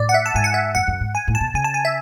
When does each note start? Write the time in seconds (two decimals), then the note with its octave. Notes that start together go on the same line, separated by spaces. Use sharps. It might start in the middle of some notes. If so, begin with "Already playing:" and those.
Already playing: A2 D5
0.09 F#5
0.14 E5
0.26 A5
0.35 G#2 G#5
0.44 F#5
0.54 E5
0.75 F#2 F#5
0.87 F#2
1.00 G#2
1.15 G#5
1.28 A2
1.35 A5
1.41 B2
1.54 C#3 G#5
1.64 A5
1.74 G#5
1.85 E5